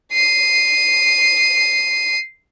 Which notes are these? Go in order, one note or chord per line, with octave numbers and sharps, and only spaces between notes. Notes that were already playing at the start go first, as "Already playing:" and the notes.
C7 D#7